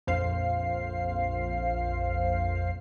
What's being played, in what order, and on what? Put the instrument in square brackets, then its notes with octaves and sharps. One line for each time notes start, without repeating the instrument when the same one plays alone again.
[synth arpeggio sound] A#1 F2 C5 F5 C7